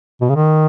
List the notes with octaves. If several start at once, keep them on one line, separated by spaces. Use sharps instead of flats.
B2
C#3
D#3